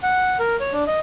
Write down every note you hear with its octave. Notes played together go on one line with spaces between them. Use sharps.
F#5
A#4
C#5
D4
D#5